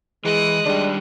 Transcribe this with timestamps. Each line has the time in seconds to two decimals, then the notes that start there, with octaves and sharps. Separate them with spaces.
0.25 E3 G#3 D#6 F#6
0.66 D#3 G3 G#3 D4 G4